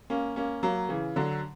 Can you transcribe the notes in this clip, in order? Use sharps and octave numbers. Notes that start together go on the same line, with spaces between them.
A#3 C#4
A#3 C#4
F#3 A#3
C#3 E3
D3 F#3